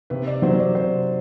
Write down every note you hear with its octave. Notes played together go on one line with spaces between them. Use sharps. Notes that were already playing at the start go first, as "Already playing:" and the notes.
C3 B4
D5
F#3 C5
C5
D5
C3 C5